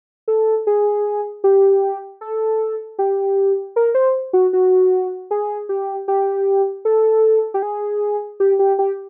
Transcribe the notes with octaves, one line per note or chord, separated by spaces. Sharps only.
A4
G#4
G4
A4
G4
A#4
C5
F#4
F#4
G#4
G4
G4
A4
G4
G#4
G4
G4
G4